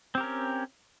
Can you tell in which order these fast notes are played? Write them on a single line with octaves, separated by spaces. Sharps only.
C4 G4 A#4 C#4